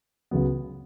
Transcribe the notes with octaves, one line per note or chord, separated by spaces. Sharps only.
C#2 C#3 F#3 B3